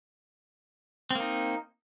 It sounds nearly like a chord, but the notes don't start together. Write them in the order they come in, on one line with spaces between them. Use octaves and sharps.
C4 A#3 D#4